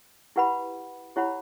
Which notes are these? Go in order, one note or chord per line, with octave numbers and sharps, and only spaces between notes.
E4 G4 B4 F#5 B5
E4 G4 C#5 F#5 B5